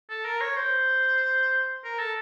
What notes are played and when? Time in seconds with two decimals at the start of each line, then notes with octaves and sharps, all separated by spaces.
0.09 A4
0.25 A#4
0.41 C#5
0.56 C5
1.84 A#4
1.99 A4